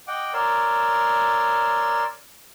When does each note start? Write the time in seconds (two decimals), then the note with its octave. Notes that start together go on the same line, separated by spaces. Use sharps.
0.08 D#5 F#5 G5 D6
0.34 A#4 C#5 D5 C6 E6